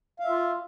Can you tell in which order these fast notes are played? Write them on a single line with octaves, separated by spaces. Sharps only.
F5 E5 F4